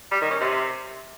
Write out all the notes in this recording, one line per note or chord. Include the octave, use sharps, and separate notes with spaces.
G3
D#3
C#4
C3